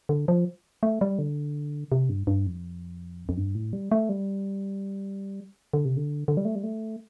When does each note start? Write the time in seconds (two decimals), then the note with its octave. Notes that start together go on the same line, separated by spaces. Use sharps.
0.09 D3
0.28 F3
0.83 A3
1.01 G3
1.19 D3
1.92 C3
2.09 G2
2.27 G2
2.47 F2
3.29 F2
3.37 G2
3.55 A2
3.73 G3
3.92 A3
4.09 G3
5.73 D3
5.85 C3
5.97 D3
6.28 D3
6.37 G3
6.45 A3
6.55 G3
6.64 A3